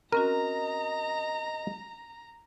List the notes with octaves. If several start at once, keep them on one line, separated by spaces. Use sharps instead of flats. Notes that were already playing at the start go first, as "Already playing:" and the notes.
C4 C#4 F#4 A#4 D#5 A#5